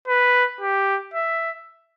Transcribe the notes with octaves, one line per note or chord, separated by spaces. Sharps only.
B4
G4
E5